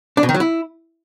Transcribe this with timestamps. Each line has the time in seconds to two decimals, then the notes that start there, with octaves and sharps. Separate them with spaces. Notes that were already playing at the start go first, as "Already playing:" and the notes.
0.17 D4
0.23 B2
0.29 D#3
0.34 F#3
0.40 E4